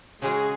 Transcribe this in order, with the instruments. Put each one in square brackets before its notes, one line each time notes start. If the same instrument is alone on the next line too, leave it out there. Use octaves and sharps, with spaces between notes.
[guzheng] C#3 G#3 C#4 F#4 [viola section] G#4